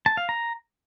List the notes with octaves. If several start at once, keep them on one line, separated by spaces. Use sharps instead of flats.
A5
F5
A#5